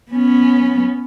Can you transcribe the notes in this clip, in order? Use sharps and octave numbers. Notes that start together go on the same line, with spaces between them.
B3 C#4